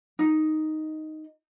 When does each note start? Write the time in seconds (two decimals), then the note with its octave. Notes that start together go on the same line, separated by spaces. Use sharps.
0.19 D#4